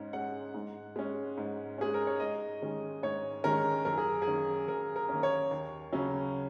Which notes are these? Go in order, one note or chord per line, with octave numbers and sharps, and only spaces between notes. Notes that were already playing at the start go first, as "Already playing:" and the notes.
Already playing: G#2 G#3 C#4
G#3 C#4 F#5
G#2
G#3 C#4
G#2
G#3 C#4 G#4
A#4
C#5
G#2 D#5
D#3 G#3 C#4
G#2 C#5
D#3 G#3 C#4 A#4
F#2 A#4
G#4
G#4
D#3 A#3 C#4
F#2 A#4
A#4
D#3 A#3 C#4
C#5
D#2
C#3 F#3 C#4